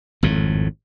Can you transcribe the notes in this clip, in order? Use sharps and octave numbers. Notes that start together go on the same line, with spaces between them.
G#1 F2 A2